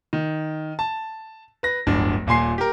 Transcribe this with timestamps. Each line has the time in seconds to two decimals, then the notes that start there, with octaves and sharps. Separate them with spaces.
0.13 D#3
0.79 A5
1.63 B4 A#6
1.87 D1 G1 D4
2.27 D#1 A#2 G#5 C6 C7
2.58 G4 A#4